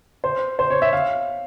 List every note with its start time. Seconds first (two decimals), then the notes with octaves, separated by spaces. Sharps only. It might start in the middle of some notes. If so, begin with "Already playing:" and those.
0.24 C5
0.59 C5
0.70 C#5
0.82 E5
0.93 F5